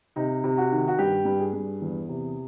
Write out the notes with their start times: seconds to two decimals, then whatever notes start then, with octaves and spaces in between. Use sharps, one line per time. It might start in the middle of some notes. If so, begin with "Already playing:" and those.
0.16 C3 D#4
0.44 C3
0.58 F#4
0.72 D#3
0.88 F#4
0.98 G2 G4
1.25 G2
1.39 G#4
1.54 G2
1.81 E2
2.09 C3